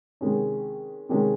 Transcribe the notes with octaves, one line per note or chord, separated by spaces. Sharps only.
C3 D#3 G#3 C#4
C3 D#3 G#3 C#4